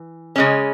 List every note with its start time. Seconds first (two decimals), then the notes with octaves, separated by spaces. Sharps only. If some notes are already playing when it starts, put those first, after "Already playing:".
Already playing: E3
0.36 C#3 G#3 C#4